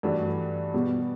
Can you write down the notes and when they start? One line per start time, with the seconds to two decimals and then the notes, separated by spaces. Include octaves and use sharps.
0.03 G2 E3 A3 D4 F#4
0.74 B2 G3 B3 F#4